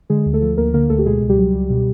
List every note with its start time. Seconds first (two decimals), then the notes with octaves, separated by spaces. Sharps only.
0.10 D3 G#3 G#4
0.26 D2
0.33 A3 A4
0.42 F3
0.57 D2 A#3 A#4
0.73 D3 A#3 A#4
0.90 D2 A3 A4
0.99 G4
1.05 B2 G#3 G#4
1.22 C#2
1.29 G3 G4
1.38 F#3
1.54 C#2
1.70 B2